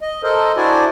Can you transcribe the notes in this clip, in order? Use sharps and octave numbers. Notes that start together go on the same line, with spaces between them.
D#5
A4 A#4 C5 D#5
D4 E4 F#4 C5 D5 G#5